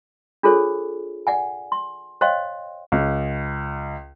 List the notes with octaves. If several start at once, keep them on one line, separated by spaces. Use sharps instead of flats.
D4 F4 G#4 A4 C5 C#5
D5 F#5 G#5
C6
C5 C#5 D#5 F5 G5 C6
C#2